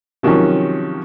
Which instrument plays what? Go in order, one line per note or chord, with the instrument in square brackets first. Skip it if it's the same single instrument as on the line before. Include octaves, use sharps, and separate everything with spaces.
[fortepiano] C3 D#3 F3 F#3 C#4